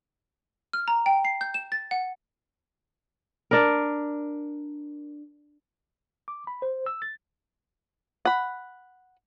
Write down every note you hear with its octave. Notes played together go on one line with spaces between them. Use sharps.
F6
A#5
G5
C7
G6
E7
A6
F#5
D4 A#4
D6
B5
C5
E6
A6
F#5 B5